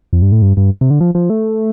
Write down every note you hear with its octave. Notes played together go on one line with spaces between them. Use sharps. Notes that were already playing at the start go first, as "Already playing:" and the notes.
F2
G2
A2
G2
G2
C3
D3
F3
F3
A3